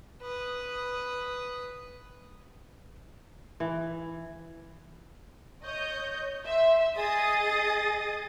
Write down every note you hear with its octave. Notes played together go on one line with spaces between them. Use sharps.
B4 D#6
E3
C#5 D#5 G6
E5 C6
G#4 D#5 D#6 A6